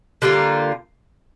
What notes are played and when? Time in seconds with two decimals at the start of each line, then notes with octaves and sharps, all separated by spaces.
0.22 D3 G3 A#3 F4